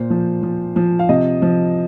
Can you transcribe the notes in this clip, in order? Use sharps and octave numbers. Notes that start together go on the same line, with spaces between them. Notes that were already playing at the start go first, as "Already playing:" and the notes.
Already playing: A#2 C5
F3
F3
F3
F5
C3 D#5
F3